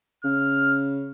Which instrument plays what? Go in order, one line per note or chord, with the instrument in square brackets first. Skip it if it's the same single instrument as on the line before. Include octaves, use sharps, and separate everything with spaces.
[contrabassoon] C#3 [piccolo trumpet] F6